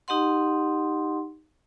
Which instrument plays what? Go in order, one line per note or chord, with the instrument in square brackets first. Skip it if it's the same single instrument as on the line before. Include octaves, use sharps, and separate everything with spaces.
[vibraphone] D#4 G4 D#5 F#5 C6